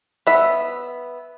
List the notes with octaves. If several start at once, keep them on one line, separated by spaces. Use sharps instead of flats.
B3 E5